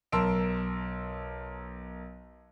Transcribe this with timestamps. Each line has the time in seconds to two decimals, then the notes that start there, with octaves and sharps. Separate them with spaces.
0.12 B1 A#4 A5 C6 E6 D7